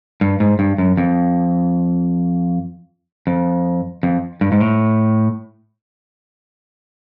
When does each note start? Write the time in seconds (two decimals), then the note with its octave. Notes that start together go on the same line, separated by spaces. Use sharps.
0.21 G2
0.40 G#2
0.59 G2
0.78 F#2
0.97 F2
3.27 F2
4.03 F2
4.41 G2
4.52 G#2
4.61 A2